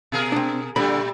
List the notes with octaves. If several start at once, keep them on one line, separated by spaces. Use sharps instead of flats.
B2 G#4 A#4
C4 D4
A#2 D3 G3 A3 B5